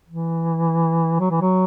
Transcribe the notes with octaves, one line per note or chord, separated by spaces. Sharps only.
E3
F#3
E3
F#3